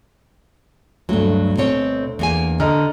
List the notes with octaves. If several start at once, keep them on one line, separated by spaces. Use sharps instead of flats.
D2 G2 F#3 A3
B2 C4 C#5
E2 A#3 G#5
D3 D#5 A#5 F6